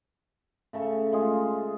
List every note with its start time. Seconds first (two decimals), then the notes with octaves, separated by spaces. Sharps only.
0.73 C#3 A3 A4 C#6
1.12 G#3 F4 G#4